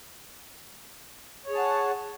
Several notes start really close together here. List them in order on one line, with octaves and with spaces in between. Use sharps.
C#5 G#4 A5 F#5